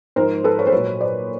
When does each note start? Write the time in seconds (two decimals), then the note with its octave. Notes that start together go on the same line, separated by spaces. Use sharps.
0.16 G#2 F3 A#4 C5
0.44 A4 B4
0.59 B4 C#5
0.67 C5
0.72 A#2 F#3 B4 C#5
1.00 C5 D5